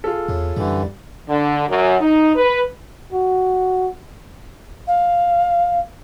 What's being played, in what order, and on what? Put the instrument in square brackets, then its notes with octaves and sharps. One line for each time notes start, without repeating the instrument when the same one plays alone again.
[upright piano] F4 G#4 A4
[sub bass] E2 [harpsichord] A2
[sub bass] F#2 [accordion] D3 E3 [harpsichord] G3
[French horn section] D3
F#2
D#4
B4
[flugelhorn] F#4
[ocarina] F5